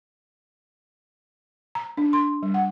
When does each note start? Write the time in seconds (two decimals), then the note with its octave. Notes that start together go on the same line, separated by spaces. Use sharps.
1.75 A#5
1.97 D4
2.13 C6
2.43 G3
2.54 F#5